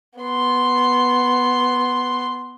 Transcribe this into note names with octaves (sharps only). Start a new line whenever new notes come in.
B3 C6